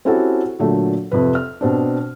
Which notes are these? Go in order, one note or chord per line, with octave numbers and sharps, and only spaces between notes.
C4 C#4 E4 F#4 G4 A4
A#2 D3 F#3 A3
F2 C3 B4
F6
B2 C4 D4